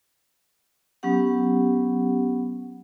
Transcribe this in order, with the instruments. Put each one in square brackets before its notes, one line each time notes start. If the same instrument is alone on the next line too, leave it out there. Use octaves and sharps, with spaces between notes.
[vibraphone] F#3 B3 C#4 G4 F#5